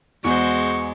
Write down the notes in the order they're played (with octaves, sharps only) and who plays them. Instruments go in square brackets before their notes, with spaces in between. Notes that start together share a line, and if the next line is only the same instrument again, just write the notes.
[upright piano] E2 [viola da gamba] G#3 [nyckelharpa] F#4 C5 [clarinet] C#6